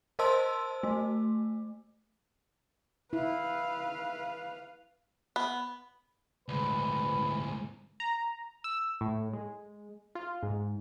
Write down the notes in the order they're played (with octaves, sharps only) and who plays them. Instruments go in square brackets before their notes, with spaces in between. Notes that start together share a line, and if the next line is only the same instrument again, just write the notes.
[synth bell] A#4 C5 D#5 A5 C6 E6
A3
[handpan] E4 [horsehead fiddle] B4 F5
[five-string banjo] B3
[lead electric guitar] D2 G#2 [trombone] B4
[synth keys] A#5
E6
A2
G#3
F4
G#2